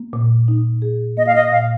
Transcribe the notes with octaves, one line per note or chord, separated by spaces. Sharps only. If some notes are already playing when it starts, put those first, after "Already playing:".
Already playing: A#3
A#2
D#4
G#4
A#3 D#5
F5
D#5
A#2 F5